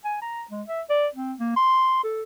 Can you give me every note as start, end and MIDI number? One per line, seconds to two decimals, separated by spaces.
0.05 0.17 80
0.22 0.44 82
0.51 0.62 56
0.68 0.81 76
0.90 1.08 74
1.15 1.33 60
1.40 1.52 58
1.56 2.01 84
2.04 2.23 69